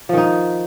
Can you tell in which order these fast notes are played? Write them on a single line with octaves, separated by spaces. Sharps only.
F3 D#3 D#4